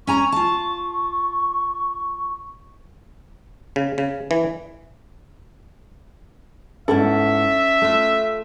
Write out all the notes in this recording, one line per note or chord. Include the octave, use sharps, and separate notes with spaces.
C#4 G#5 A#5 C#6
F4 A5
C#3
C#3
E3
G#2 B3 C#4 E4 A4 E5
A3 F4